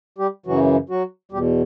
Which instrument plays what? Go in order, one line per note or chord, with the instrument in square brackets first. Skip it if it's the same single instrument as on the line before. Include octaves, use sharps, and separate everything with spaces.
[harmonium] G3 G4
F#2 C#3 E3 F#3 F#4
F#3 F#4
E2 B2 G3 G4